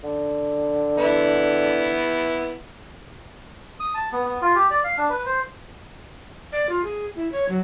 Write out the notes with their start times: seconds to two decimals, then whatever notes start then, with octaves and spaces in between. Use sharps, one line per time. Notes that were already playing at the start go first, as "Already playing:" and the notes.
0.04 D3
0.98 B3 E4
3.80 D#6
3.95 A5
4.12 B3
4.25 B3
4.42 F4
4.55 G4
4.70 D5
4.84 F5
4.98 D4
5.10 B4
5.26 C5
6.52 D5
6.69 F4
6.84 G#4
7.16 E4
7.32 C#5
7.49 F#3